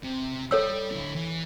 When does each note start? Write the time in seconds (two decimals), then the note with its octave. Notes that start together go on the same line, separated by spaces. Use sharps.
0.04 C3
0.51 G3 A4 C#5 E6
0.92 D3 E4
1.15 E3